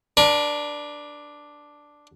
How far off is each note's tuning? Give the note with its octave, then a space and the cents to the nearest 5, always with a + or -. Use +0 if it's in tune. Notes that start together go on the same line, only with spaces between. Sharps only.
D4 +0 A#4 +45